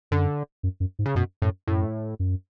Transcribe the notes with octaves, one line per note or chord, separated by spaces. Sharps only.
F#2 D3
F#2
F#2
G#2
C#3
F#2 B2
F#2 A2
F#2 A2
F#2